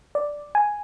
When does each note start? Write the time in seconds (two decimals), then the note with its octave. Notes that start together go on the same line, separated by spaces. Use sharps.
0.15 D5
0.55 G#5